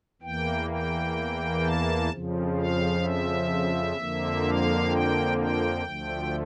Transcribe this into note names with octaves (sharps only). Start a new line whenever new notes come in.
E2 E3 A#3 G5
G5
A5
F2 C#3 F3
F5
E5
F2 D3 F3 A#3
F5
G5
G5
D2 D3 F3 A3